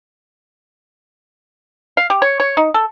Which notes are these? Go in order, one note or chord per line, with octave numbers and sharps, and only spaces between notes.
F5
G4
C#5
C#5
D#4
A4